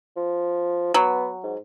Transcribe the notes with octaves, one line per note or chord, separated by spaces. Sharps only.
F3
F#3 B3
G#2